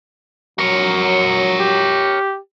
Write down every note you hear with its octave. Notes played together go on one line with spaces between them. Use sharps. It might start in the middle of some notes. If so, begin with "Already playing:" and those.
F#3 A#4 C#5
G4